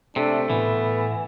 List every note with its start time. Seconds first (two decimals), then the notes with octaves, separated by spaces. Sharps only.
0.16 C3 A3 D4
0.50 A2 E3 B3